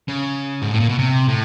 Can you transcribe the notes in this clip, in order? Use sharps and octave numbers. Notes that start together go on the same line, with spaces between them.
C#3
G#2
A2
A#2
B2
C3
A2